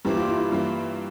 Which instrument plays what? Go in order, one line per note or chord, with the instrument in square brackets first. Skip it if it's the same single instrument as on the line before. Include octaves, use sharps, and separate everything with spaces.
[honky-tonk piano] G2 E3 A#3 [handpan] G4
[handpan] F4
E4
E4
[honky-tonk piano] G2 E3 A#3